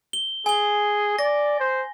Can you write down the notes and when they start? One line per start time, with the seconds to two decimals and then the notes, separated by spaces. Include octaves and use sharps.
0.13 G7
0.46 G#4 G#5 G7
1.19 D5 A#6
1.60 C5